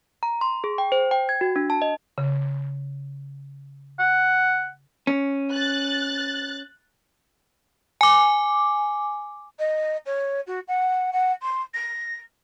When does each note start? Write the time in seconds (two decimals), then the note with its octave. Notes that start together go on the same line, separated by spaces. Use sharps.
0.23 A#5
0.41 C6
0.64 G#4
0.78 G5
0.92 C5
1.11 G5
1.29 G#6
1.41 F#4
1.56 D4
1.70 A5
1.82 D#5
2.18 C#3
3.99 F#5
5.07 C#4
5.52 F#6 A6
8.01 G#5 D6
9.59 D#5
10.06 C#5
10.47 F#4
10.68 F#5
11.13 F#5
11.42 C6
11.74 A#6